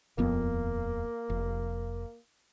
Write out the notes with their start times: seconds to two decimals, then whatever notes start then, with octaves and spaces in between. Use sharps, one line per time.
0.18 D#1 F2 A#3 B3
1.30 F1